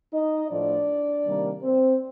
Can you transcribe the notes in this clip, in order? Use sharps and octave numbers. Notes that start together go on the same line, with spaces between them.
D#4 D#5
A2 F3 A3 D4 D5
C3 D#3 G3 A#3
C4 C5